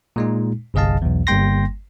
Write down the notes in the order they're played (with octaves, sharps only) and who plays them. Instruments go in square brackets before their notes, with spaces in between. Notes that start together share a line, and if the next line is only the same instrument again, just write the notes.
[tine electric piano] A#2 G#3 D#4
G1 C2 G#4 D#5 F5 A5
B1 E2
G1 G3 A#3 G5 C6 A#6